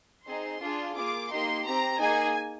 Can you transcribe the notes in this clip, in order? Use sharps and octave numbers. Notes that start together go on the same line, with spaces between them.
C4 D#4 G#4 C6
D4 F4 G#4
A#3 F4 G#4 D6
A#3 D#4 G4 C6
C4 G4 A#5
A#3 D#4 G#4 G#5